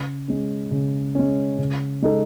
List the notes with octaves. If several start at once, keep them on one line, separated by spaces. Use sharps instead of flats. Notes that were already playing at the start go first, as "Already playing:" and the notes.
Already playing: C#3
G#3 C#4
C#3
G#3 C#4
C#3
G#3 D#4 A4